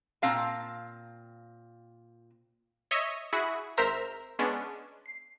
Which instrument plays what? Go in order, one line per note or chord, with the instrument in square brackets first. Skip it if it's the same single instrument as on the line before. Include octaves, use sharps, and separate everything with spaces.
[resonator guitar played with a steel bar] A#2 C4 F5 A5
[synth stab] C#5 D#5 E5
E4 F#4 G#4 B5
G#1 A#4 C5 E5 A#5 B6
G#3 B3 C#4 D4
C7